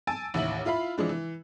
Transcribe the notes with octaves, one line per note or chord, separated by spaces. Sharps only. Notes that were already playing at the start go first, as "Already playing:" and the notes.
G#5 A5 E6 A6 D7 D#7
A1 D#2 E5 F#7
E4 F4 E5 F5 B5
E3 F3 G#3 D4
E3